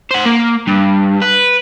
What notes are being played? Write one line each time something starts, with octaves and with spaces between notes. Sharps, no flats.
C5 F#5
A#3
G2
B4